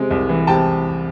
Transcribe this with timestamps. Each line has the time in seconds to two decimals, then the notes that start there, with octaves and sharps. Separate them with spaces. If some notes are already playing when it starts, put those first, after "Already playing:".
Already playing: C3 G#3
0.11 C2
0.29 E3
0.47 C3 G5 A5